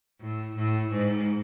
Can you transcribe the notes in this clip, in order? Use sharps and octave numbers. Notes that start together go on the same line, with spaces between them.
A2
A2
G#2